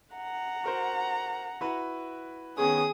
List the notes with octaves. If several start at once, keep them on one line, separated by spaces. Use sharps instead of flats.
F#5 A#5
F#4 A#4 C5
E4 F#4 B4
D#3 B3 C#4 G#4 D#6